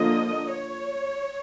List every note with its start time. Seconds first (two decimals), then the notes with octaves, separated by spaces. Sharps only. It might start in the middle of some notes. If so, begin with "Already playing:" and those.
Already playing: D3 F3 A#3 D4 D#5
0.50 C#5